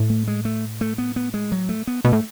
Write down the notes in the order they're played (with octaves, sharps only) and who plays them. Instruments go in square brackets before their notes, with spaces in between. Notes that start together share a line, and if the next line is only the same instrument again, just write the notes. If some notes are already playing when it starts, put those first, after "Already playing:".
Already playing: [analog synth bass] A2
[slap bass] A3
G#3
A3
A3
B3
B3
G#3
F#3
A3
B3
[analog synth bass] B2 [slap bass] A3
[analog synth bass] A2